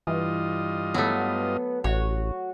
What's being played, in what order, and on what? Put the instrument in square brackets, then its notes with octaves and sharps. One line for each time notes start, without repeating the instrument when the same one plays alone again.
[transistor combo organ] G2 F4 D#5 [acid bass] E3
[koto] F#3 A3 [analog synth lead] B3
[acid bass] A1 [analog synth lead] F#4 [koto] C#5